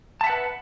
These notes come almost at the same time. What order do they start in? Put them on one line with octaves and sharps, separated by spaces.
A5 E5 F#5 B4